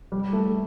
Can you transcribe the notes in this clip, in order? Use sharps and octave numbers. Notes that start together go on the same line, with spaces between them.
G3
A3